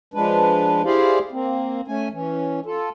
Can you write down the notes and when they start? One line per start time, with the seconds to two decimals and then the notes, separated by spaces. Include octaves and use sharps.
0.14 F3 G#3 D4 B4
0.85 E4 G4 G#4 C5 D5 F5
1.32 A#3 C4
1.88 A3 C#4 G#5
2.12 E3 C#4
2.66 F4 A4